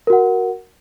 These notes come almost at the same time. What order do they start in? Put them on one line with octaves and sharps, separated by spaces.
A#4 F#4 F#5